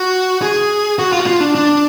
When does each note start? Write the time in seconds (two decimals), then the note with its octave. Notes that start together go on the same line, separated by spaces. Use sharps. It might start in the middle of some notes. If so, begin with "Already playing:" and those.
Already playing: F#4
0.42 G#4
0.99 F#4
1.13 F4
1.20 F#4
1.27 F4
1.40 D4
1.55 D4